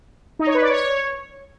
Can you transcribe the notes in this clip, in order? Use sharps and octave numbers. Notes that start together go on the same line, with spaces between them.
D#4
C#5
B4
D5
C#5